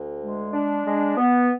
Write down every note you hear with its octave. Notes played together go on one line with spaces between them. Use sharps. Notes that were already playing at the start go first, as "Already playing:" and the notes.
Already playing: D2
G#3
D4
G#3
B3